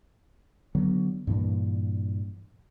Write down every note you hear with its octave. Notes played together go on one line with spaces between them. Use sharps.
D3 F#3 B3
G2 A#2 E3